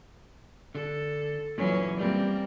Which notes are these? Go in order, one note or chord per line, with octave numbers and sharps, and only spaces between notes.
D3 A4
F#2 A#2 E3 F#3 C#4
G3 A#3 C4